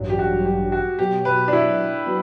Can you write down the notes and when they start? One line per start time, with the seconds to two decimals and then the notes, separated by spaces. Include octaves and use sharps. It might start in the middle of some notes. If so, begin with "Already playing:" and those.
Already playing: A1 G2 F#3
0.10 G4
0.19 F#4
0.45 G4
0.72 F#4
0.99 B2 F#3 B3 G4
1.25 B4
1.48 D4
1.53 E4
2.06 F#3 B3